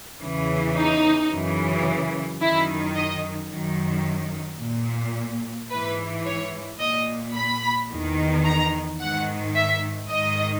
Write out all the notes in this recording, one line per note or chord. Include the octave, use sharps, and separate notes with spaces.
E2 C#3 E3
D#4
F#2 C#3 E3
F#2 D#3 E4
D#5
F#2 D#3
A#2
G#2 E3 B4
C#5
A#2 D#5
B5
E2 D#3
A#5
G#2 D#3 F#5
E5
G#2 D#3 D#5